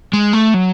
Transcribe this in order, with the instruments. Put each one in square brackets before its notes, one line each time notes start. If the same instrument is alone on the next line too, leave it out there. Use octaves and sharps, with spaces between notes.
[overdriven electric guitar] G#3
A3
F#3